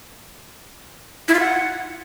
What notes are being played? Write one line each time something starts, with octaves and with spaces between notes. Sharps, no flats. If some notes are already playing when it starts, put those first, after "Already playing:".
E4
F4
F#5